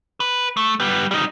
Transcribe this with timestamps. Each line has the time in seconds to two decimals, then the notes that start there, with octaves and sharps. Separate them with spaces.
0.20 B4
0.57 A3
0.80 G3 B3
1.11 G3 D#4